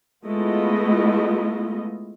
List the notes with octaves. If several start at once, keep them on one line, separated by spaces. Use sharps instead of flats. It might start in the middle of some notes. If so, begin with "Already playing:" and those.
G#3 A3 B3 E4 F4 D#5